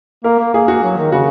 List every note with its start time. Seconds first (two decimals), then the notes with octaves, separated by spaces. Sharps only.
0.24 A#3 A#4
0.39 A#3
0.54 A#3 G#4
0.68 A#3 F#4
0.83 F#3
0.97 D#3
1.12 C#3 F#4